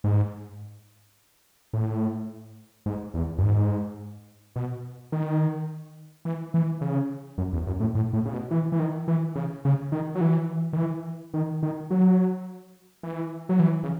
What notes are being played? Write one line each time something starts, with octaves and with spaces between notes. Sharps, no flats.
G#2
A2
G#2
E2
F#2
G#2
B2
D#3
E3
E3
C#3
F#2
E2
F#2
A2
A2
A2
C#3
B2
E3
E3
D#3
E3
C#3
C#3
D#3
F#3
E3
D#3
E3
D#3
D#3
F#3
E3
F#3
E3
C#3